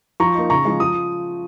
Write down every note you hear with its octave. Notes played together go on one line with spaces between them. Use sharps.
F3 A#5 C#6
A#3 D#4
C#3 A#5 C#6
F3 G#3
F3 D#6